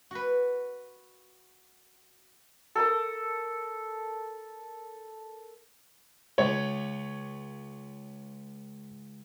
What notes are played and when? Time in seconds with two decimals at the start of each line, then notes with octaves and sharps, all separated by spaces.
0.11 F#4 B4
2.75 A4 A#4 D#6
6.38 C#2 C#5